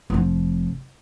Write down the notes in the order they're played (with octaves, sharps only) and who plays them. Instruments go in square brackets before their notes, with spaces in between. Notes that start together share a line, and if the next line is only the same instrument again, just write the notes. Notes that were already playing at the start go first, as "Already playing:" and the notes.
[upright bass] F1 F3